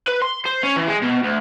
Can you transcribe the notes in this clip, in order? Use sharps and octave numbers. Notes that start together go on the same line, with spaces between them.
B4
C6
C5
C#4
E3
G#3
B2
D2